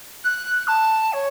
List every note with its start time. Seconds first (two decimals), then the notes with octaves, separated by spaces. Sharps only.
0.24 F#6
0.67 A5
1.12 C#5